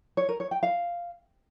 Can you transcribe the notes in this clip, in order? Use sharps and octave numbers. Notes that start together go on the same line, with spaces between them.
C#5
A#4
C#5
G5
F5